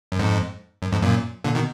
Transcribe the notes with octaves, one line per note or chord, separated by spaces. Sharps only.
F#2
F2 G#2
F#2
F2 G#2
F#2 A#2
A#2 D3
B2 D#3